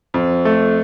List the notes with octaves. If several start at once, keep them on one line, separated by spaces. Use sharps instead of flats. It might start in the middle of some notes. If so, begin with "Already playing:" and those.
F2
A3